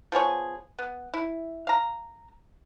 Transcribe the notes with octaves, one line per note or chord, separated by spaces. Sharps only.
F3 B3 G#4 C#5
B3
E4
F5 A#5